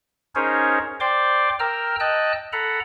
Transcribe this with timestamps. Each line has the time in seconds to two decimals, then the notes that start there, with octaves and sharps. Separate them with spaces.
0.35 C#4 D#4 G#4 A#4 C5 C#5
1.00 C5 D5 G5 C6 D6
1.60 A#4 G5 A#5 E6 F6
2.00 D#5 G5 A5 E6 F#6
2.53 A4 F#5 A#5 B5